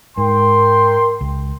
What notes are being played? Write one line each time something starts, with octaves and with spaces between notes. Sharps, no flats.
G#2 A#4 G5 C6
C#2